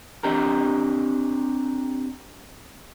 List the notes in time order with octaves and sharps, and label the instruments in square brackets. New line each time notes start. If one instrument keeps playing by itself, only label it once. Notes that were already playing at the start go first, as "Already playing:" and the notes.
[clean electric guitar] C4 D4 G4 A#4